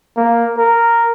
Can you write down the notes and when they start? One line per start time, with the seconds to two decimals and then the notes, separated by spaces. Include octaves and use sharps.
0.17 A#3
0.58 A#4